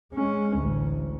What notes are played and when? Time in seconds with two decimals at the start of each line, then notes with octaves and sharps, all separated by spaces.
0.12 G#3 C#4
0.56 A1 D2